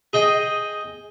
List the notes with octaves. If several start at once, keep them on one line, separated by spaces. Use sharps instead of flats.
G#4 D#5 G5